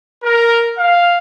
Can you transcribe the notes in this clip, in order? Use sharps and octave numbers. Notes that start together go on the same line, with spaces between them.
A#4
F5